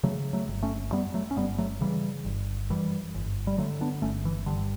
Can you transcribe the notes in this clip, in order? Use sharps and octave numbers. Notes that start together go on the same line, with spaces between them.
C#3 F#3 A3
F#3 A3
G1
A3 C#4
F#2 G3 B3
F#3 A3
C#4
G1 G3 B3
F#3 A3
C#3 E3 G3
G1
F#2 E3 G3
G1
G3
D3 F#3 A3
B3 D4
G1 A3 C#4
E3
G2 D3